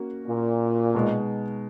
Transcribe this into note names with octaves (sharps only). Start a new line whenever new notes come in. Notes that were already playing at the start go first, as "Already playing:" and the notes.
Already playing: A#3 C#4 F#4
A#2
B2 G#3 D#4